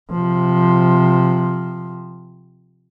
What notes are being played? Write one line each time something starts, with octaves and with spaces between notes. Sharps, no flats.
C3 F3